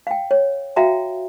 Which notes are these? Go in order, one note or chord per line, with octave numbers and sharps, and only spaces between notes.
F5 G5
C#5
F#4 E5 F5 G5 A#5